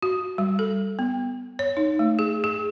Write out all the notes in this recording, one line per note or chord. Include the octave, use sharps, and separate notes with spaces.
F#4
G3
A4
B3
C#5
D#4
A3
G#4
G#4